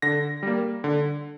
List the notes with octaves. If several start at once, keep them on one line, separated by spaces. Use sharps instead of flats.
D3 A#6
G3 A#3
D3